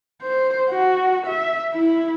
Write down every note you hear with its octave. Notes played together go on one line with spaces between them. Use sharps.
C5
F#4
E5
E4